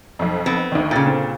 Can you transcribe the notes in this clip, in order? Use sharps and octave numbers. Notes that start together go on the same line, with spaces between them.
B1 F2
B3 C4
D2 D#3
A#2 C#3 G5 A6
D3 C4